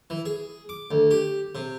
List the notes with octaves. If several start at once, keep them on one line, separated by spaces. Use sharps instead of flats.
E3
G#4
D6
D2
G4
C3